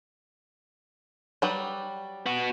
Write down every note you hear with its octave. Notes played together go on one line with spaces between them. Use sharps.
F#3 G3 B4
B3 F#4